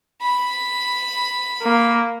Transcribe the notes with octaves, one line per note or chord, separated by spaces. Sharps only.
B5
A#3